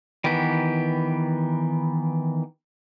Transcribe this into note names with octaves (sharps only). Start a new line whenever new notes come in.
D#3 E3 B3 G4